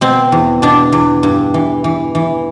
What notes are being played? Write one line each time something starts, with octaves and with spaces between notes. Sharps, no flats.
B2 C4
E2
B2 D4
E2
G2
E3
E3
E3